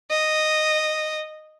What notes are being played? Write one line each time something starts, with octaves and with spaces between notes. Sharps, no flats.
D#5